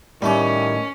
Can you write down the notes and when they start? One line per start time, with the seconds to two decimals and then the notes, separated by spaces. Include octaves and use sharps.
0.22 A2 D#3 G3 A3 C#4 D6